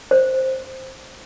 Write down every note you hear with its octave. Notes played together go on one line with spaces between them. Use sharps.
C5